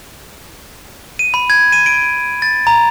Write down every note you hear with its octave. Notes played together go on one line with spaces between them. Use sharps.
D#7
B5
G#6
D#7
D7
A6
A#5